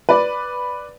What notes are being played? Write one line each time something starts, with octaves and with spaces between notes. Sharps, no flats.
B4 D5